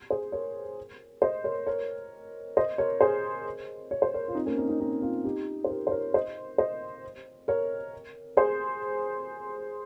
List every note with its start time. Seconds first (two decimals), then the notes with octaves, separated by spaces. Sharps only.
0.10 G#4 C5
0.32 A#4 C#5
1.22 C5 D#5
1.44 A#4 C#5
1.67 A#4 C#5
2.57 C5 D#5
2.78 A#4 C#5
3.01 G#4 C5
3.91 C#5
4.02 C5
4.14 A#4 C#5
4.28 F4
4.35 C4 D#4
4.46 A#3 C#4
4.57 C4 D#4
4.68 C4 D#4
4.80 C4 D#4
5.02 C#4 F4
5.25 D#4 G4
5.64 C5
5.69 G4 A#4
5.87 C5
5.91 A#4 C#5
6.14 C5 D#5
6.58 C5 D#5
7.48 A#4 C#5
8.37 G#4 C5